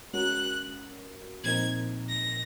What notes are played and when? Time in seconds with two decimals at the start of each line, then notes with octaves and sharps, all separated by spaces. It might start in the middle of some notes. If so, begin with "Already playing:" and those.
0.13 G#3 C#4 F#4 A#4 F#6
1.44 A#2 F3 C4 D#4 A#4 G#6
2.09 A#6